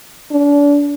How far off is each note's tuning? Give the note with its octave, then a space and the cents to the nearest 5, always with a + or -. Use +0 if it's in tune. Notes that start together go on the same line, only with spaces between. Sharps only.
D4 -35